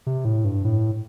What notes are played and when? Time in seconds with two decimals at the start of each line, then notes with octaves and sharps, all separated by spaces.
0.06 C3
0.25 A2
0.45 G2
0.64 A2